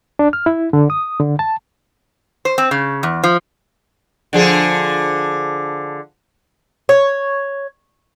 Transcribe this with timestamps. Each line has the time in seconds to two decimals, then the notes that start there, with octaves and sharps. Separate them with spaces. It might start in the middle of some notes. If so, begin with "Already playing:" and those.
0.19 D4
0.33 F6
0.46 E4
0.73 D3
0.90 D#6
1.20 D3
1.39 A5
2.45 C5
2.58 C4
2.71 C#3
3.03 E2
3.24 F3
4.33 D3 F3 G#4
6.89 C#5